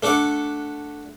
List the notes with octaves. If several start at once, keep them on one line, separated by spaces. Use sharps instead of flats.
A3 D4 A4 F#5 D6